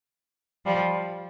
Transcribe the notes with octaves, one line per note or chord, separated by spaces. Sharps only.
F3 G3